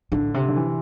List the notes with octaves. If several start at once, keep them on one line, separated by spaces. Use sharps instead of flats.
A2 D3
C3
D3
E3